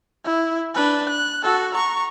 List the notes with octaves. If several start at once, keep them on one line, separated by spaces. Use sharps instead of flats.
E4
D4 B4
F#6
F#4 A4
A#5 C#6